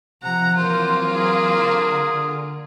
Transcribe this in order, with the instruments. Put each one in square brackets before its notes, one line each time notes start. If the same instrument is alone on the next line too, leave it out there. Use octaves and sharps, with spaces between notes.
[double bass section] C3 F3 [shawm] F#5 [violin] A#5
[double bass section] E3 F#3 C4 [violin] A#3 F4 [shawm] C5
[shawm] G#4
[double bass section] D3